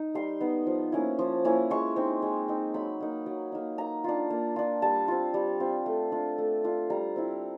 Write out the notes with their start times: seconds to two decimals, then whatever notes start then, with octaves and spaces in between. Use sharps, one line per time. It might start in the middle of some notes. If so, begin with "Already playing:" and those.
Already playing: D#4
0.15 G3 C6
0.41 B3 D#4
0.67 F3
0.92 A#3 C#4 E4
1.19 F3
1.45 A#3 C#4 E4
1.70 G#3 C#6
1.96 C4 D#4
2.22 G#3
2.48 C4 D#4
2.74 F#3 B5
3.00 A#3 D#4
3.26 F#3
3.52 A#3 D#4
3.78 A#3 A#5
4.04 D4 F4
4.30 A#3
4.56 D4 F4
4.82 G3 A5
5.08 C4 F4
5.34 G3
5.60 C4 F4
5.86 A3
6.12 D4 F4
6.38 A3
6.64 D4 F4
6.90 G3 A#5
7.16 C4 E4